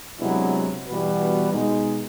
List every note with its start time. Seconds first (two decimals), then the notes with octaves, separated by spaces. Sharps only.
0.19 C3 F#3 G#3 B3 D4 E4
0.89 B2 E3 G3 B3 F#4 B4
1.52 B2 G#3 D#4